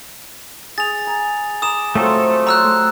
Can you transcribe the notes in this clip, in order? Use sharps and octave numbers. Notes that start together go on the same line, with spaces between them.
G#4 A6 F7
A#5
A#5 D6 D#6 E7
F#3 A3 C4 F4 A4
F#3 A#5 C6 E6 F#6